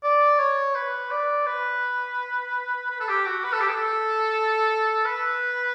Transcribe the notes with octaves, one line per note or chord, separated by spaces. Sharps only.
D5
C#5
B4
D5
B4
B4
A4
G4
F#4
B4
A4
G4
A4
B4